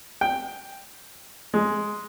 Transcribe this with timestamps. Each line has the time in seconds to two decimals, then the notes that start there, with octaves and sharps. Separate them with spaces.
0.21 G5
1.54 G#3